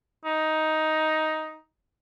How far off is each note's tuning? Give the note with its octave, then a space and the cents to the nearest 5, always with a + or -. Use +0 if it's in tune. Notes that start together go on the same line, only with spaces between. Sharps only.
D#4 +10